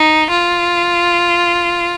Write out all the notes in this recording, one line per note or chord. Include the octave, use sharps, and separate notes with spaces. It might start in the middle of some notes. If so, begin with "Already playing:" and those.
Already playing: D#4
F4